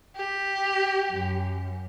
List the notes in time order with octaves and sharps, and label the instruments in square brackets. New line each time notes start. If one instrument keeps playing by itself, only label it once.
[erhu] G4
[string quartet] F#2